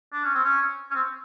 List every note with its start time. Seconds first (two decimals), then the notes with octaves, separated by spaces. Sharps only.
0.13 D4
0.24 C#4
0.35 C4
0.45 C#4
0.91 C#4
0.95 C4